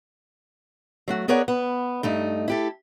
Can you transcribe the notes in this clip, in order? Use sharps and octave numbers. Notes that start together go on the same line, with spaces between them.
F#3 A3 F#4
B3 G#4 A#4 C#5 D5 F#5
B3
G2 A3 D#4
E4 G4 A4